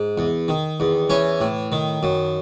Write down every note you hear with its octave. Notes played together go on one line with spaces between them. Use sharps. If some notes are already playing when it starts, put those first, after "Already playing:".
Already playing: G#2
E2
D#3
E2
E3 C#4
A2
D#3
F#2